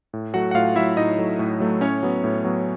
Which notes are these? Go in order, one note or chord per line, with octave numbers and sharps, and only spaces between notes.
A2
F#3 A3 F#4 F#5
F#5
A2 F4 F5
F#3 A3 E4 E5
A2 D#4 D#5
F#3 A3
A2
F#3 A3
A2 C#4 C#5
F#3 B3
A2
F#3 B3